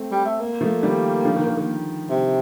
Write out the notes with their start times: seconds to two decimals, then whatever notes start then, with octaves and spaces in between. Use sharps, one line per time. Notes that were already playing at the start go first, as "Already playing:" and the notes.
Already playing: A3 C4
0.12 G3
0.26 A3
0.40 A#3
0.61 F3 A3
0.83 D#3 G3
1.24 D3 F3
1.36 D#3
1.47 D#3
1.57 D#3
2.10 C3